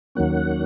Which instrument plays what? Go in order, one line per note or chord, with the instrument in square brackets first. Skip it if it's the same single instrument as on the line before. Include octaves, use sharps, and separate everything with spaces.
[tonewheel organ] D#2 D#3 F#3 A#3 C#4 F#5